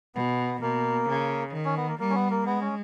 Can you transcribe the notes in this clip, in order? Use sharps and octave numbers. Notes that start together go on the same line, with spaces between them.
B2 B3
B2 A#3
C#3
D#3
C#4
B3
A#3
G3 A#3
C#4
B3
A#3
G#3 B3
C#4